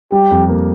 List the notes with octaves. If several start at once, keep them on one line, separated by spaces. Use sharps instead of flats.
G3 G4
F2
A#3